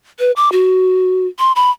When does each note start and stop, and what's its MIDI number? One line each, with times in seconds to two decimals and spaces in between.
0.20 0.31 71
0.36 0.51 86
0.52 1.27 66
1.39 1.52 84
1.56 1.71 83